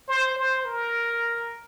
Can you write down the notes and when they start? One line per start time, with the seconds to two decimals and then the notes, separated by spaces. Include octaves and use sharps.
0.08 C5
0.36 C5
0.65 A#4